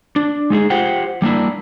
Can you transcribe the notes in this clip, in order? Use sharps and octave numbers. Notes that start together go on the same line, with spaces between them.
D4
G#3 D#4 G4 G#4
F4 G4 C5 F#5 G5
G3 A#3 D4 E4